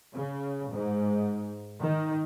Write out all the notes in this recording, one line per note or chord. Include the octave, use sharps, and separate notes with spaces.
C#3
G#2
D#3